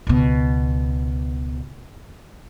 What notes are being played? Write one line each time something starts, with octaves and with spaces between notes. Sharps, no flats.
C#2 B2